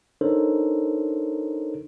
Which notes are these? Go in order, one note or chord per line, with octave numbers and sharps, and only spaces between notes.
D4 D#4 A4 A#4 C5 C#5